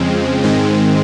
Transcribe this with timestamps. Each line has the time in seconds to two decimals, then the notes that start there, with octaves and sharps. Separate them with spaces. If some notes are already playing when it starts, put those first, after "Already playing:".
Already playing: F2 C#3 F3 G#3 C4
0.44 G#2 D#3 G#3 C4